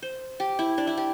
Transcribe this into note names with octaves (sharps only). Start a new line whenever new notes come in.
C5
G4
E4
D4
E4
G4